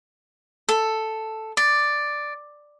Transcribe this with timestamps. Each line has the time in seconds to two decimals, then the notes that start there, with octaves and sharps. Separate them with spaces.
0.69 A4
1.57 D5